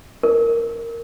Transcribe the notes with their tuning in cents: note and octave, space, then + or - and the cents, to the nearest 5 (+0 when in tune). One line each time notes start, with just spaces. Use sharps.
A#4 -10